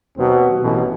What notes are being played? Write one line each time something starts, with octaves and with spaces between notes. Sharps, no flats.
D#2 B2 F#3 C4
A1 B2